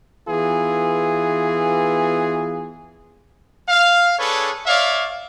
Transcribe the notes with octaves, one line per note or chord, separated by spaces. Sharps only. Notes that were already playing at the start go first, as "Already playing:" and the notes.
E3 B3 F4 G#4
F5
D4 G#4 A4 B4 C#5
C#5 D5 E5 F5